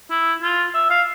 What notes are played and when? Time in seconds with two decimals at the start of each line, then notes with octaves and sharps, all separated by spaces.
0.11 E4
0.42 F4
0.74 E5
0.90 F5